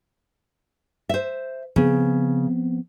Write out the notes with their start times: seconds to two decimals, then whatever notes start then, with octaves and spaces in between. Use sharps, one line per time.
1.09 C5 E5
1.76 C#3 F3 B3 C4